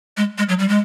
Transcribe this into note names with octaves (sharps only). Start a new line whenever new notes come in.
G#3
G#3
F#3
G3
G#3